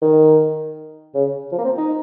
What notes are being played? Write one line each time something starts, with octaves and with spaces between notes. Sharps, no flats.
D#3
C#3
F3
A#3
C4
D#4